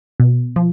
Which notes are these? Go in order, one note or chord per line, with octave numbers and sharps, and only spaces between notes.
B2
F3